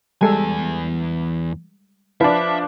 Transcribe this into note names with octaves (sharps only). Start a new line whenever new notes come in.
E2 G3 G#3 A4 G#5
F3 D4 B4 E5